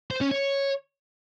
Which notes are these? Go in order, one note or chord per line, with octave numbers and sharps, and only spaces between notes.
C5
C#4
C#5